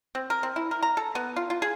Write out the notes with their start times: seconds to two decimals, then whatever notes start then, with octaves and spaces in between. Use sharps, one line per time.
0.15 C4
0.30 A#4
0.43 C4
0.56 E4
0.71 A#4
0.83 A#5
0.97 A4
1.15 B3
1.36 F4
1.50 F4
1.62 G#4